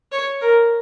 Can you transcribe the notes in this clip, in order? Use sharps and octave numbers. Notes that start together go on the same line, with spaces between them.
C#5
A#4